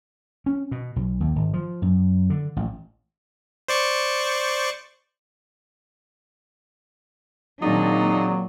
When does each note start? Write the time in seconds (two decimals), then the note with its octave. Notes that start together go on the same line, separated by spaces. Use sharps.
0.46 C#4
0.71 B2
0.96 B1
1.20 D#2
1.36 G#1
1.54 F3
1.82 F#2
2.30 D3
2.56 A1
3.69 C5 D5 C#6
7.62 A#2 D#3 F#3 A#3 C4 D4 D#4 G#4